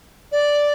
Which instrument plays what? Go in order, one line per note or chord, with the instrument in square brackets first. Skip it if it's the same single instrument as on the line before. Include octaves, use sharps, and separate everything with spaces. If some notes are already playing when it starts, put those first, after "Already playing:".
[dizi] D5